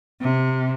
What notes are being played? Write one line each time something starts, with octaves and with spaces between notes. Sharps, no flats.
C3